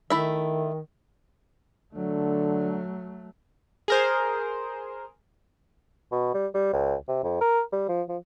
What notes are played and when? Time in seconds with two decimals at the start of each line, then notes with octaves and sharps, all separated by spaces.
0.10 D#3 A3 E4 E5
1.95 D3 F#3 A3
3.88 G#4 A#4 C5
6.12 B2
6.34 G3
6.54 G3
6.73 C#2
7.08 C3
7.24 F2
7.41 A#4
7.72 G3
7.89 F3
8.09 F3